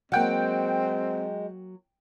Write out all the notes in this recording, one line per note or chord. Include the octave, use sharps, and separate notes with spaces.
F#3 G#3 A#3 C4 F#5 G5